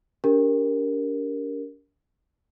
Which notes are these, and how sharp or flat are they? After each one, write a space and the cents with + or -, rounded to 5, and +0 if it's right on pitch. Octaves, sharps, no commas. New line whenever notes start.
D4 -40 G4 +0 A#4 +0